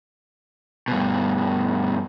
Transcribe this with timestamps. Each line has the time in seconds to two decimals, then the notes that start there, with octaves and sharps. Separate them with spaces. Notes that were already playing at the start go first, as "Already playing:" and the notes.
0.88 G2 B2